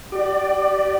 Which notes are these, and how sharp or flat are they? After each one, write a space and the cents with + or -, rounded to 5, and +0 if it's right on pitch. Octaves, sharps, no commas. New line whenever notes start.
G4 -40 D5 +15